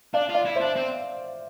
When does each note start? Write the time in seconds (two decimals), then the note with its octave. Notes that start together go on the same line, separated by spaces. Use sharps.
0.14 D4 D5 F5
0.29 F4
0.34 D5 F5
0.45 E4
0.56 D4 C5 E5
0.76 C4